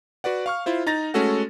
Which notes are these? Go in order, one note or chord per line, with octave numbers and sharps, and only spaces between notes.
F#4 B4 D5 F#5
F5 C#6 F6
E4 F4 C5
D#4 A#5 A6 A#6
G#3 A3 C#4 F#4 A4 F#5